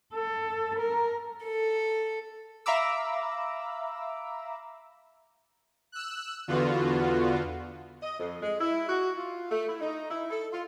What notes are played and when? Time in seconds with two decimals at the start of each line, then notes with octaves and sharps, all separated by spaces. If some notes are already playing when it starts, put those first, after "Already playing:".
0.14 A4
0.79 A#4
1.43 A4
2.66 E5 F5 A#5 B5 D6 E6
5.92 E6 F#6
6.48 E2 D3 B3 F4 F#4
8.03 D#5
8.19 F2
8.42 G#3
8.60 E4
8.89 F#4
9.17 F4
9.51 A3
9.69 E4
9.81 D#4
10.10 E4
10.30 A4
10.52 F4